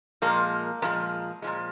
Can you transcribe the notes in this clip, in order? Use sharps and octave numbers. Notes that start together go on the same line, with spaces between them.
A#2 F3 G#3 A#3
A#2 F3 G#3 B3
A#2 F3 G#3